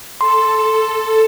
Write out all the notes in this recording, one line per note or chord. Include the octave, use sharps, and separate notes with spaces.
A4 C6